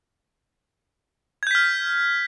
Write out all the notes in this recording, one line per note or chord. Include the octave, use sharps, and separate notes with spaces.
F6 G6 G#6 B6